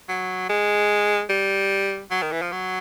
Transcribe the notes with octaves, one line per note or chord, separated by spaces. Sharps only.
F#3
G#3
G3
F#3
D#3
E3
F3
F#3